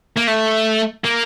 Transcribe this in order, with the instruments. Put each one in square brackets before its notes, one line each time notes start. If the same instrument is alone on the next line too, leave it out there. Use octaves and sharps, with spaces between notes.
[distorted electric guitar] A#3
A3
A#3